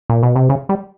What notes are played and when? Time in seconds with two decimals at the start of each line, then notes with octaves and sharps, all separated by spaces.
0.10 A#2
0.23 B2
0.36 C3
0.50 C#3
0.69 G3